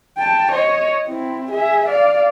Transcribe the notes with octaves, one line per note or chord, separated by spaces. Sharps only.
G5 A5
C#5 D#5
C4 E4
G#4 E5
D5 F5